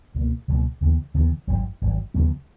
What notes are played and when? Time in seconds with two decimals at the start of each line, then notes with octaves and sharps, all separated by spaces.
0.14 C#2 B2 F#3 A#3
0.48 C#2 B2 F#3 A#3
0.81 D#2 C#3 E3 B3
1.14 D#2 C#3 E3 B3
1.47 G#1 F#2 D#3 F#3
1.81 G#1 F#2 D#3 F#3
2.14 D#2 C#3 F#3 B3